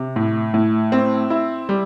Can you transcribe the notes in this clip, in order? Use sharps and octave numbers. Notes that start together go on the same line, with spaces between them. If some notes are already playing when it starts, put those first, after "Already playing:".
Already playing: C3
A2
A2
C4
E4
G3